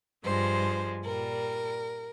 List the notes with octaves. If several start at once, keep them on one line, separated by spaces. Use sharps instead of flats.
G2 F3 G#3 C5
A#2 G3 A#4